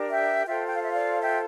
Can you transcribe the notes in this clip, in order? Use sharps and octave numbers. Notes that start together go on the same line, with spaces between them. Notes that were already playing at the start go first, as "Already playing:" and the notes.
Already playing: D4 G4 A#4
E5 G5
F4 A4 C5 E5 G5
G5
F5
E5
D5 F5
E5 G5